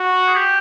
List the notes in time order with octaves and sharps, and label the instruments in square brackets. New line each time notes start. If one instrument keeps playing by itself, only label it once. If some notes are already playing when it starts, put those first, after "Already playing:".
Already playing: [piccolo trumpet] F#4
[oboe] G#4
G4